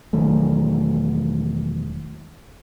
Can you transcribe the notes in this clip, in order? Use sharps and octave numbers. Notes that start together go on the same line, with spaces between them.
E1 D#3 F#3 A3